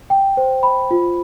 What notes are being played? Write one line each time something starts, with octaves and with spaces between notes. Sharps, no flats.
G5
C5
B5
F4